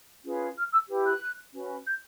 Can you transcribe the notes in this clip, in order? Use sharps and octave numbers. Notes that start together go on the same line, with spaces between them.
C#4 F4 G#4 B4
F6
E6
E4 G4 B4
F#6
C#4 F#4 B4
G6